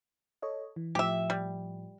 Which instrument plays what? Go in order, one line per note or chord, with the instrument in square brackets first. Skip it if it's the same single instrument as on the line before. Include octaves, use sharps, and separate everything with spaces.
[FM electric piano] A4 C#5 D#5
E3
[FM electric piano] A2 F3 [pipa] G4 E5
[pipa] G3